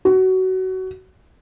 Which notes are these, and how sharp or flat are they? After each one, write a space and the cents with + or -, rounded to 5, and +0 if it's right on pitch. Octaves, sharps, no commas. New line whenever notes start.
F#4 +20